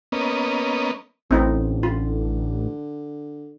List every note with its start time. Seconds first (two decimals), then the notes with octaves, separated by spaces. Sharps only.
0.12 A#3 B3 C#4 D#5
1.31 A1 D3 C4 D#4 E4
1.83 F4